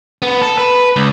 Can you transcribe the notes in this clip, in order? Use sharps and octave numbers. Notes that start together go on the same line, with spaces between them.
B3
A4
B4
C#2